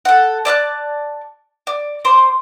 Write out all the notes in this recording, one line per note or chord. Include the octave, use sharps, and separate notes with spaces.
A4 F#5
D5 E5 A5 F#6
D5
C5 C6 D6